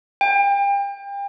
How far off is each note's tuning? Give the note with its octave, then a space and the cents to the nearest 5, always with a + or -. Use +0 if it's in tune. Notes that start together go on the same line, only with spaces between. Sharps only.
G5 +35